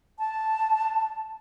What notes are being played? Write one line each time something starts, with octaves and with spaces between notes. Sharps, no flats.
A5